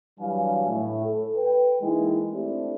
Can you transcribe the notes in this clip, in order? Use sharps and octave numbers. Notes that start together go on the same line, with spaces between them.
G2 E3 F#3 G3 F5 G#5
A2
A4
B4 G5
E3 G#3 A#3 D#4 E4
A3 C4 D4 E4 G4 A4